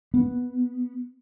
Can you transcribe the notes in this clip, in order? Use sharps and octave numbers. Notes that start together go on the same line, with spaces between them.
B3